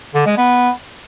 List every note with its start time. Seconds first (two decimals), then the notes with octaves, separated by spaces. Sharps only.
0.14 D3
0.26 G#3
0.37 B3